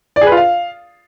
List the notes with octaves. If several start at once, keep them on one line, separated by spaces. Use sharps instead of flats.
D5
G#4
B4
F4
F5